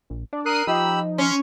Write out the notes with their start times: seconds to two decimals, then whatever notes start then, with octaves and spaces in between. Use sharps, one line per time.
0.10 A#1
0.33 D4 D5
0.46 A#4 D#6 F#6 C7 D#7
0.67 F3 D#4 G4 B5 E6
1.18 C#4 C6